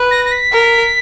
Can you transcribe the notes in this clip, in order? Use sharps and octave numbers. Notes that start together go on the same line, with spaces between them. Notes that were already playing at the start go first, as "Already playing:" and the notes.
Already playing: B4
A#6
A#6
B6
A#4